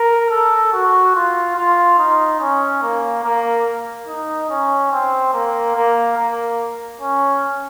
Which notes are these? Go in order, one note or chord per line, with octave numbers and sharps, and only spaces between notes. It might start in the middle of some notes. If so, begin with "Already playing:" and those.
Already playing: A#4
A4
F#4
F4
F4
D#4
C#4
A#3
A#3
D#4
C#4
C4
A#3
A#3
A#3
C#4